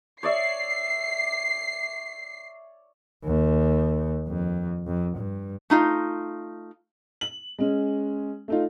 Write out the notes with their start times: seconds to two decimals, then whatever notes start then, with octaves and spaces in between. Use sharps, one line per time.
0.23 C#5 D5 E5 C7
3.24 D#2
4.28 F2
4.87 F2
5.17 G2
5.70 A3 D#4 F4
7.21 F#7
7.59 G#3 C#4
8.48 A3 D#4 F4